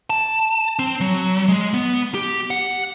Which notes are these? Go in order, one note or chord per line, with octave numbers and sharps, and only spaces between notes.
A5
C4
F#3
G#3
B3
G4
F#5